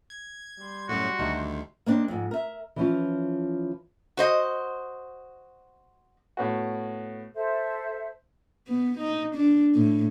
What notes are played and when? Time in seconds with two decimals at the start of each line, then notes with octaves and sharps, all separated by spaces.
0.10 G#6
0.60 G3 C6
0.89 F#2 A2 F#4
1.19 D2 D#3 A3 G4
1.86 A#3 C4 D4 D#4
2.08 F2 G#2
2.31 A#4 E5
2.76 E3 F3 C#4 F4
4.17 F#4 C5 D#5
6.37 A2 B3 F#4
7.34 A4 C5 E5
8.67 B3
8.99 D#4
9.35 D4
9.75 A2